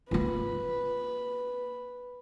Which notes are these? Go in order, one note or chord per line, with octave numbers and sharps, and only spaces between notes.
A#3 F4 B4